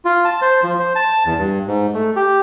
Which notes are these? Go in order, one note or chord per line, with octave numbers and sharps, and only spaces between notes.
F4
A5
C5
F3
C5
A5
E2
G2
G#2
A3
G4